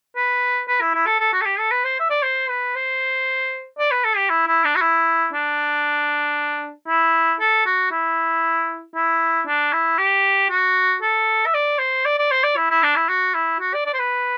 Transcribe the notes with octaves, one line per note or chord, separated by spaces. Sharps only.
B4
B4
E4
E4
A4
A4
F#4
A4
G4
A4
B4
C5
E5
D5
C5
B4
C5
D5
B4
A4
G4
E4
E4
D4
F#4
E4
D4
E4
A4
F#4
E4
E4
D4
E4
G4
F#4
A4
E5
D5
C5
D5
D5
C5
D5
E4
E4
D4
E4
F#4
E4
F#4
D5
D5
C5
B4